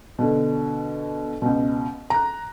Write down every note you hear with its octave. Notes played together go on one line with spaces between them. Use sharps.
B2 D3
C#2 B2
A#5 F#6